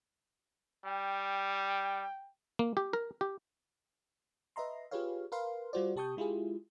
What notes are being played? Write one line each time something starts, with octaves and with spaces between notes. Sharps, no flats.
G3 G5
A#3
G4
A#4
G4
B4 D#5 E5 A#5 C6
F4 G4 G#4 B4 C#5 F5
A#4 B4 F5 C6
G3 F4 F#4 C5 D5
C3 G4 A5 C#6 D#6 G6
G#3 E4 F4 G4 G#4